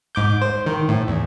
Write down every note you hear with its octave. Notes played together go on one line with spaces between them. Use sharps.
G#2 D6 G6
C5
D#3
A2
E2